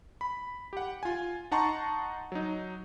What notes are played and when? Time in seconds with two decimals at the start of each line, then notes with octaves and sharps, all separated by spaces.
0.21 B5
0.73 G4 F#5
1.03 F4 G#5
1.51 D#4 F#5 A5 A#5 C6 C#6
2.32 F#3 D#4